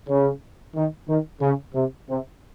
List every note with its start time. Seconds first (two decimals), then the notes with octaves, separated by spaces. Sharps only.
0.08 C#3
0.75 D#3
1.08 D#3
1.41 C#3
1.74 C3
2.09 C3